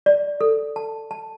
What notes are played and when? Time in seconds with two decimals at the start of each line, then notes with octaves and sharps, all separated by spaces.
0.06 D5
0.41 A4
0.76 A5
1.11 A5